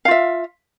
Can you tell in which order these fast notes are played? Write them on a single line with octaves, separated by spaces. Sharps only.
F5 F4 E5